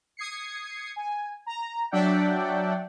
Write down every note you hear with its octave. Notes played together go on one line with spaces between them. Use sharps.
D#6 G#6 C7 C#7
G#5
A#5
F#3 D4 D5 E5 F#5 G5